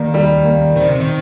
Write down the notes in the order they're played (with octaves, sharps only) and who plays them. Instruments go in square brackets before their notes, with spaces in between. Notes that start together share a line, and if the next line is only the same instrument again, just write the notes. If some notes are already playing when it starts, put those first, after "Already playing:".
Already playing: [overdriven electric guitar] D#3 [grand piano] G3 A#3
[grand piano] G3
A#3
[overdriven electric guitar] D#3 [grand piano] C4
[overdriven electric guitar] C3
D#3